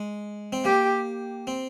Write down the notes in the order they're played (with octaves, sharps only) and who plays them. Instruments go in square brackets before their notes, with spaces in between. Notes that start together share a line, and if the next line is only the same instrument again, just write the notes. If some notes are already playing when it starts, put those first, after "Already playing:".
Already playing: [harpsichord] G#3
C4
[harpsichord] A#3 [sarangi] G4
[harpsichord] C4